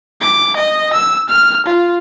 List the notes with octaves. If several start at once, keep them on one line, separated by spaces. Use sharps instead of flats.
D6
D#5
E6
F6
F4